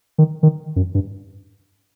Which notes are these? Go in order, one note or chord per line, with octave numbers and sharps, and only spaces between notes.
D#3
D#3
F#2
G2